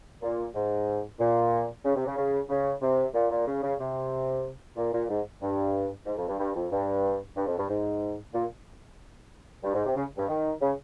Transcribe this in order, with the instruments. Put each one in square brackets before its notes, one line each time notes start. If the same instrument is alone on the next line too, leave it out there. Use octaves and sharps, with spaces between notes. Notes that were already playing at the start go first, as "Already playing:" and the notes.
[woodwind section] A#2
G#2
A#2
C#3
C3
C#3
C#3
C#3
C3
A#2
A#2
C#3
C#3
C3
A#2
A#2
G#2
G2
G#2
F2
G2
G2
F2
G2
G2
F2
G2
G#2
A#2
G2
G#2
C3
C#3
G2
D#3
C#3